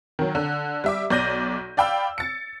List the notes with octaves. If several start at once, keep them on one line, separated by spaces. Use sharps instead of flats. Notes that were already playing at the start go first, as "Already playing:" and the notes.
D#3 F#3
D3
G3 E5 D6
B1 D5 G6 A#6 D#7
D5 F5 G5 B5 E6
A6 C#7